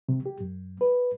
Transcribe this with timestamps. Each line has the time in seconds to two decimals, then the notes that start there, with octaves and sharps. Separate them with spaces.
0.09 C3
0.26 G4
0.40 F#2
0.81 B4